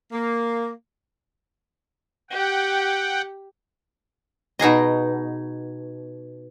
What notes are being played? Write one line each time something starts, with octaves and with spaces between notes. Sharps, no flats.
A#3
G4 F#5 G5
B2 D#4 G#4 D#5